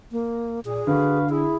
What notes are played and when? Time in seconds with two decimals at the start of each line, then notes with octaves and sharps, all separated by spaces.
0.12 A#3
0.65 A#2 G#4
0.87 D3 F#4 B4 F5
1.30 E4 G#4